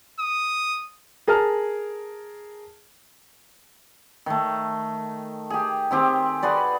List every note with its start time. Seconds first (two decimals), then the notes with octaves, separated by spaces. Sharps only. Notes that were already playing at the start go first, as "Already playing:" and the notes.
0.19 D#6
1.27 G#4 A#4 A5 F6
4.26 D#3 A3
5.50 G4 G#4
5.91 D#3 C4 G4 G#4
6.43 F#4 G#4 B4 D5